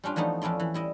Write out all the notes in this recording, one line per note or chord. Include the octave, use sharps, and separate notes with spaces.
G3 C#4 D4 F4
E3 F3 A3 B3 D#4
F2 C#4 E4 D5 C6
E3
G3 E4 D#5